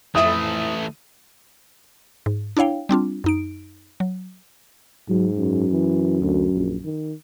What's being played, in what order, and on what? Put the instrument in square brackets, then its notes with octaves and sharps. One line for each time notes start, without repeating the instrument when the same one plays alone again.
[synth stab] F2 E4 [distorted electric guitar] E3 A3 [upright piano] D#6
[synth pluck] G#2
D4 E4 C#5 F5 G5
G3 C4 D4 F4
F#2 D#4 D7
F#3
[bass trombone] G#2 [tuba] F#3
[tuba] F#2
[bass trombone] E3
D2
A#1
D#3